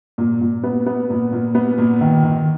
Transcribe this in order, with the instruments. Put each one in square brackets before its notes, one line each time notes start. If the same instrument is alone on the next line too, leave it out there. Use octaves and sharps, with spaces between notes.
[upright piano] A#2
A#2
B3
B3
A#2
A#2
B3
A#2
D#3
D#3